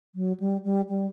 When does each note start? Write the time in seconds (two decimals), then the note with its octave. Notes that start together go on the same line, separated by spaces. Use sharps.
0.15 F#3
0.40 G3
0.64 G3
0.89 G3